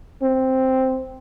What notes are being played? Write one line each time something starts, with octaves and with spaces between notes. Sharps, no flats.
C4